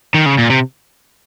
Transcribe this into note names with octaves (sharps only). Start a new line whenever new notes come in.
D#3
C#3
A#2
C3